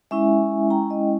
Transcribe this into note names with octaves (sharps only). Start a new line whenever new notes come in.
G#3 C#4 E4 E5 G#5
G5 A#5
D#5 G5